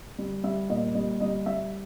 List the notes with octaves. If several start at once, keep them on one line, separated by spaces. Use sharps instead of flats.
G3
G3 E5
A#2 D#5
G3 D#5
G3 D#5
G3 E5